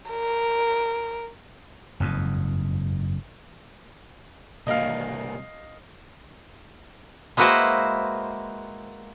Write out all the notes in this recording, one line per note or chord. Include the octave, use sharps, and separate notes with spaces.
A#4
F#1 F2 G#2
C2 A#3 D#5 F5
G#3 A#3 E4 F#4 B4 C5